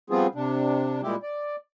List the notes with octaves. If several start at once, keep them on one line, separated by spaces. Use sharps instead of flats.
F3 G3 B3 C4 F4 G#4
C3 D4
A#2 G3 G#3 E4 G4
D5